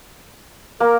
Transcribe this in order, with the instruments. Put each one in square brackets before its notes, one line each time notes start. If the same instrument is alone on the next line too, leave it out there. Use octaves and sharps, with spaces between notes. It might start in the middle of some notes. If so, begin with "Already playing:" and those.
[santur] A#3 [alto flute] A#4